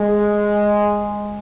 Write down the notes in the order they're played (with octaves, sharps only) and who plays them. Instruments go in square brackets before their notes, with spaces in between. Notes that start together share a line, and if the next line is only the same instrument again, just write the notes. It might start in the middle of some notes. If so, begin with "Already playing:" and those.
Already playing: [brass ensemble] G#3